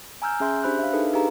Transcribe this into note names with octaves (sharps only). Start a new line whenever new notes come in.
G#5 A#5 E6 F6 G6
C#4 G#4 E5 C6 G6
D4 G4 C5 B5 F#6
E5 F5
D4 D#4 G#4 A4 B4
D#4 G4 G#4 B4 F5 A#5